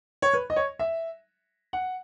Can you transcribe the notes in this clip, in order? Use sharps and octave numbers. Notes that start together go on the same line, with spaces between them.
C#5
B4
D#5
C#5
E5
F#5